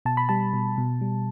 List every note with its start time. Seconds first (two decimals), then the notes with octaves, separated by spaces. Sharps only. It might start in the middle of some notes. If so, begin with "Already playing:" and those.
0.05 B2 A5
0.17 B5
0.29 G3 A5
0.53 B2
0.78 B2
1.01 G3